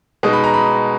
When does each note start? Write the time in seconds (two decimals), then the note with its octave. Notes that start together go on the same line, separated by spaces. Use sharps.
0.23 B2 G#3 D#4
0.33 B5
0.44 A#5
0.54 B5